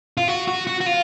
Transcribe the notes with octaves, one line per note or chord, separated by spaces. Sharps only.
F4
F#4
F#4
F#4
F#4
F4